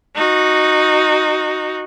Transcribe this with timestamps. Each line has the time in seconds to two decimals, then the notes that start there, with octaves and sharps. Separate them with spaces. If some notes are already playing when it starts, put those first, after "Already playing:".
0.16 D#4 F#4